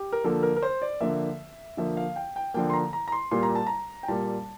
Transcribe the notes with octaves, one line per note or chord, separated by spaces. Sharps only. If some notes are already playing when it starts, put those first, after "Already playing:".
Already playing: G4
A#4
D3 F3 A#3 A4
A#4
A#4
C5
D5
D3 F3 A#3 E5
D3 F3 A#3 E5
F5
G5
G5
D3 F3 A#3 G5
C6
A#5
A#5
A#5
C6
A#2 G3 A#3 C6
A#5
A5
A#5
G5
A#2 G3 A#3 A5